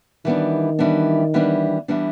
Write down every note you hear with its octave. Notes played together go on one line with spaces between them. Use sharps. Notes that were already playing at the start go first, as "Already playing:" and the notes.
D#3 E3 G3 B3 D4
E3 G3 B3 D4
E3 G3 B3 D4
E3 G3 B3 D4